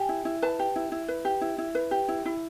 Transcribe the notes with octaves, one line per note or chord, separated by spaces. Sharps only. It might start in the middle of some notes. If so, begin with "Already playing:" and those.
Already playing: G4 G#5
E4
E4
B4 A5
G4
E4
E4
B4
G4
E4
E4
B4
G4
E4
E4